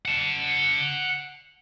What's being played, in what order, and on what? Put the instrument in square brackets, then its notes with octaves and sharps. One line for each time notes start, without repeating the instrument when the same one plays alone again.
[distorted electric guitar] F#5 A5